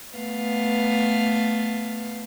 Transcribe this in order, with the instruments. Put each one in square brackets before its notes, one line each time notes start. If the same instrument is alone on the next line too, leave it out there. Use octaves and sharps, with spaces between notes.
[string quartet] A3 B3 F5